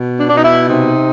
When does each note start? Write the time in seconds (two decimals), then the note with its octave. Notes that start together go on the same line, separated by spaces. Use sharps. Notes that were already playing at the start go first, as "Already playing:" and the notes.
Already playing: B2
0.17 D4
0.28 B2 D4
0.36 D#4
0.43 E4
0.68 C3 D#4